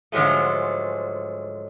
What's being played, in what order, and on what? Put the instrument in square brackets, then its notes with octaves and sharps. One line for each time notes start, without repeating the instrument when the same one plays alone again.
[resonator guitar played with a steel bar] G#2 D3 F3 F#3 G#3 A3